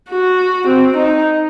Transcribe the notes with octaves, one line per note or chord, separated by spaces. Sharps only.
F#4
C4
D#4